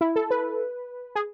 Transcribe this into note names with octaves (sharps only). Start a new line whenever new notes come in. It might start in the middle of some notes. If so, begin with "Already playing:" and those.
E4
A4
B4
G#4